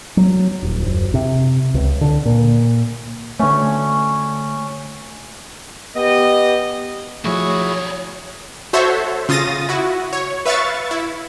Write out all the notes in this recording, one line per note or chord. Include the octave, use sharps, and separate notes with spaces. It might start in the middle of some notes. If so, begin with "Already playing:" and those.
F#3
D#1
F#1
C3
C#2
D3
A#2
D3 A3 C#4 G#5
B3 G4 D#5
B1 F3 A3 E4 F#4 G#4 C#5
F#4 A4 C5 C#5 E5
C#3 F4 D#6 A6 A#6 D#7
E4 F#4
C#5
B4 E5 F5 C#6 A6
E4